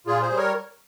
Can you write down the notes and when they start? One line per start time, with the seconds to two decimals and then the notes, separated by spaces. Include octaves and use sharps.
0.07 A#2 F4 G#4
0.22 G#4 C5
0.29 G3
0.37 A#4 C#5